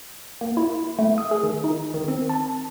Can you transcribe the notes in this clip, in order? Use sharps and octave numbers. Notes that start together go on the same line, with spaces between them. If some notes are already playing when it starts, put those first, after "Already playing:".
A#3
E4
A3
D#6
G#4
D#3
D#4
D#3
C4
A5